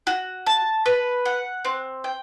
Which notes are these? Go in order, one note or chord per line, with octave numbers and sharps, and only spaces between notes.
F#4
A5
B4
F#5
C4
G5